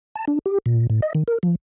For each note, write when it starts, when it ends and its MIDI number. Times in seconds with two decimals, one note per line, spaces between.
0.15 0.25 81
0.28 0.39 62
0.46 0.58 67
0.66 0.87 46
0.90 1.00 45
1.02 1.13 75
1.15 1.23 51
1.28 1.38 70
1.43 1.55 53